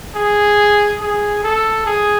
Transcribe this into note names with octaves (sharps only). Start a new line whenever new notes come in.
G#4
G#4
A4
G#4